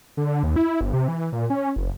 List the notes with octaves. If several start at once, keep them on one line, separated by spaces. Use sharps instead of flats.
D3
D#2
E4
G1
C3
E3
A#2
C#4
F#1